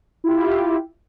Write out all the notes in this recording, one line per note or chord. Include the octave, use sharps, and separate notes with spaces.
E4 F4 G4